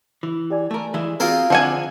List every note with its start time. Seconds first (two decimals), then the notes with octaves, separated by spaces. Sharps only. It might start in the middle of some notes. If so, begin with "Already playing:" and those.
0.23 E3
0.50 G4 D5 G#5
0.71 A3 A#4
0.94 E3 G#3 E4
1.20 C4 F4 F#4 G#4 A#4
1.50 D3 F3 C4 D4 F#5 G#5